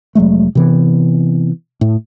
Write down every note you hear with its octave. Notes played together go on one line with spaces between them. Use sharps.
F1 F#3 G#3 A3
C3 E3 B3
A2